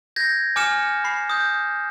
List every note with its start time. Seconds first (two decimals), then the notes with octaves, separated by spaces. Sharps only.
0.16 G6 G#6 A#6
0.56 G#5 D6 F6 C#7 E7
1.04 B5 C7
1.30 D#6 G6